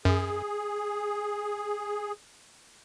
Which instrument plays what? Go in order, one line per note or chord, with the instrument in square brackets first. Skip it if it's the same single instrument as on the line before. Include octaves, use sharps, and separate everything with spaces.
[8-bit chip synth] F#2 [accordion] G#4